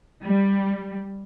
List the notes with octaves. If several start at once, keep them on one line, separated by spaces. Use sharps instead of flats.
G3